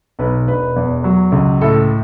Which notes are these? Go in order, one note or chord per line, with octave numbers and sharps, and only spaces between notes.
B1 B4
E1 B4
E2
F#3
C#2
A2 A4